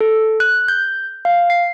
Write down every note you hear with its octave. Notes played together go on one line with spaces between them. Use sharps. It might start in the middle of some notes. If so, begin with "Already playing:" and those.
A4
F#6
G6
F5
C7